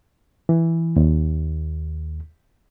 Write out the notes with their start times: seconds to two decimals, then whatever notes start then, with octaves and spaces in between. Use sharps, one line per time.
0.49 E3
0.96 D#2